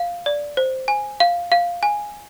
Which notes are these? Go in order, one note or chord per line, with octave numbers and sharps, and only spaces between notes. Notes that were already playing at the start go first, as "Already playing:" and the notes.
Already playing: F5
D5
C5
G#5
F5
F5
G#5